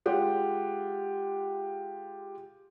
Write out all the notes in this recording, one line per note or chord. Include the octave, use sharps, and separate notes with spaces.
G#3 F4 G4 F#5